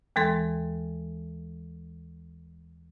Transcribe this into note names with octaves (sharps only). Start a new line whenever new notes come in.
D#2 E3 G#3 A4 C6